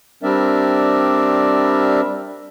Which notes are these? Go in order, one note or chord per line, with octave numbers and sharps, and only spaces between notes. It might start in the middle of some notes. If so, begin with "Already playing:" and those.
G3 C4 D4 A#4 D5 E5